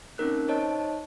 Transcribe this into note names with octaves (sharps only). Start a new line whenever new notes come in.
A#3 C4 C#4 D#4 A#4 F#6
D#4 C5 C#5 D#5 A5